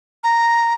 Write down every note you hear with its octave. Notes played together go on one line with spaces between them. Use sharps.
A#5